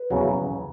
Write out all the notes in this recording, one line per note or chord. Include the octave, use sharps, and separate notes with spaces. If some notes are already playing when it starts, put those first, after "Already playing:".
Already playing: B4
E2 C#3 F#3